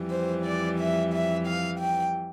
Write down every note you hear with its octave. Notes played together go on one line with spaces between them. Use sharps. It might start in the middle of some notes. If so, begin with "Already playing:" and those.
Already playing: F2 E3 G3
C5
D5
E5
E5
F5
G5